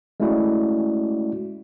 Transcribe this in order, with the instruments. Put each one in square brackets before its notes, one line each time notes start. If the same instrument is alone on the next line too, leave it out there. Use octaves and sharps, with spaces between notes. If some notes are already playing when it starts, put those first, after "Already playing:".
[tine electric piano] G#3 A3 C#4 E4 F#4 D5